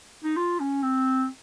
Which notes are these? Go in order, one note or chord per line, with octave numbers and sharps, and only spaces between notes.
D#4
F4
C#4
C4